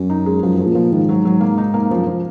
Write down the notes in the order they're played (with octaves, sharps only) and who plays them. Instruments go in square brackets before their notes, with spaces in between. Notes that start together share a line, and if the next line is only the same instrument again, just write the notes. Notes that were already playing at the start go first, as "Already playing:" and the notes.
Already playing: [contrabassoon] F#2
[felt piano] D#4
G#3
[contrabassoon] F#2 [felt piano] F3
[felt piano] F3
[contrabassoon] A#2
[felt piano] F3
[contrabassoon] G#2 [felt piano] D#3
[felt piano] F#3
F#3
A#3
D#4
A#3
[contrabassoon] F#2 [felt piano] F3
[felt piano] F3